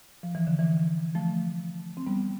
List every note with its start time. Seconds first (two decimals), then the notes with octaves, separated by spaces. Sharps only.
0.23 F3
0.35 E3
0.47 D3
0.59 E3
1.15 F3 A3
1.97 C4
2.07 G3 B3